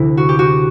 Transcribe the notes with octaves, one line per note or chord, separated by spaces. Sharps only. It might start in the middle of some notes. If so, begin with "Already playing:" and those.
Already playing: D2 C3 E3 E4
F#4
G4
F#4